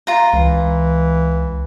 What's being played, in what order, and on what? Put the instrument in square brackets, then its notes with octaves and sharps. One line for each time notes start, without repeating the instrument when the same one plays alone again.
[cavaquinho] F4 A#5
[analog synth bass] C#2 [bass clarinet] E3